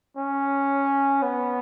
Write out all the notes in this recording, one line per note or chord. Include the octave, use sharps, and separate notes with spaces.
C#4
B3